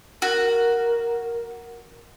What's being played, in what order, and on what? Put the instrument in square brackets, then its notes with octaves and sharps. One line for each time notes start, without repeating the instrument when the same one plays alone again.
[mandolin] F#4 [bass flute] A#4